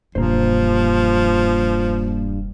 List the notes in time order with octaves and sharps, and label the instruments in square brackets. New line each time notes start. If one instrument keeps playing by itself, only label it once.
[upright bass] E1 [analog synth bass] G2 [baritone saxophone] F3 [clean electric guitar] A#3 C5